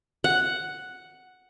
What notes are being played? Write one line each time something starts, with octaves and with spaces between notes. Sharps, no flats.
F#5